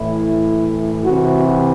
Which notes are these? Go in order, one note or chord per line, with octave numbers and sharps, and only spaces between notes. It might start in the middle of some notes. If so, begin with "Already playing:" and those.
Already playing: A2 E3 E4
C3 E3 F#4